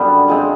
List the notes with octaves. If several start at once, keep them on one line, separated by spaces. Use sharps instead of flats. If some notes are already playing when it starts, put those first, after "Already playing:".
Already playing: F#2 D3 G3 B3
F3 G#3 C4